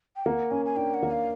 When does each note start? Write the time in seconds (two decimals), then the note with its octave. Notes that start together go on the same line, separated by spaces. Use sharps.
0.16 G5
0.26 A#3 F#5
0.51 C#4 G#5
0.65 G#5
0.76 D4 G5
0.94 F#5
1.03 A#3
1.11 F5